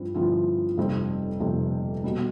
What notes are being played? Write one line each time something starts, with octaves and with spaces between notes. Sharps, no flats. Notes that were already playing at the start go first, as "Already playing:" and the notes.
Already playing: G2 F3 C4 E4
G2 D3 F3 C4 E4
F1 F2 C3 G3 C4
F1 F2 C3 G3 C4
B2 G3